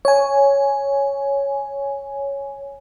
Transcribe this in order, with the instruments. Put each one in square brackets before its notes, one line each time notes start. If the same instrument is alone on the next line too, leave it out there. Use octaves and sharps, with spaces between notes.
[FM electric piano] C#5 G#5